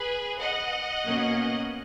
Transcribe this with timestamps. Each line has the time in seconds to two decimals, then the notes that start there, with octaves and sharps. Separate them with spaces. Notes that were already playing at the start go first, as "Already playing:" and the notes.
Already playing: G#4 B4
0.39 D#5 F#5
1.06 B2 A#3 C#4